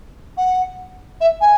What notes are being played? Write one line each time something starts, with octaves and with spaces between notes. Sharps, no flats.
F#5
E5
G#5